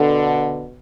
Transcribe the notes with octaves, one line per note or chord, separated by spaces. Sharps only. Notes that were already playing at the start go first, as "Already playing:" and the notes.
Already playing: B2 D3